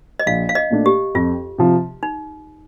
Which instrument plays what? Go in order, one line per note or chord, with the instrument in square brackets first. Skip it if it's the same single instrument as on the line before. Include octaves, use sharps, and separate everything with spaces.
[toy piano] D#5
[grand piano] A#1 [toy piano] F5
[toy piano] F5
D#5
[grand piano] A#2 A3 D4
[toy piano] G4
[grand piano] F2 [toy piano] F4
[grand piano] C3 F3
[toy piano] D#4